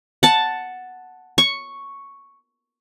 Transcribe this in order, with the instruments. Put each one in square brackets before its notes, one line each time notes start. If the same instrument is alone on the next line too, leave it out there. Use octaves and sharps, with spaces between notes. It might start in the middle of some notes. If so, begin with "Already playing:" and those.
[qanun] F#5 A5
C#6